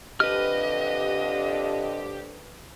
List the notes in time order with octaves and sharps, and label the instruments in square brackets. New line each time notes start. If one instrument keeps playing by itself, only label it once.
[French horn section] F2 D3 D4 [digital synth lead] G4 [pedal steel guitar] B4 F6 [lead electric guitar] D#5